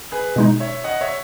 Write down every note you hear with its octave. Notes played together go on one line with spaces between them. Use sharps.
G#4 B4
B2 G#3 D#4
C#5 E5
D#5 F#5
C#5 E5